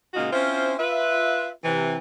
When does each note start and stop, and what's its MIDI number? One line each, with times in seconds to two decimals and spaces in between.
0.14 0.31 46
0.14 0.31 49
0.14 0.31 56
0.14 0.31 63
0.14 0.31 65
0.14 0.31 66
0.32 0.74 60
0.32 0.74 61
0.32 0.74 64
0.32 0.74 65
0.32 0.74 72
0.78 1.49 65
0.78 1.49 71
0.78 1.49 76
1.64 1.97 48
1.64 1.97 52